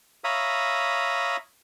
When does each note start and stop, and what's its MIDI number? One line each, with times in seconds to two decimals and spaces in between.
0.24 1.37 73
0.24 1.37 76
0.24 1.37 77
0.24 1.37 82
0.24 1.37 83
0.24 1.37 87